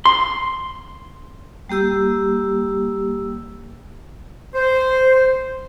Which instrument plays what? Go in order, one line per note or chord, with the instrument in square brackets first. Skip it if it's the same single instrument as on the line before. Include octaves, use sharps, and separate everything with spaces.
[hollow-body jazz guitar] C6
[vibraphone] G3 A#3 G4 E6
[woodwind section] C5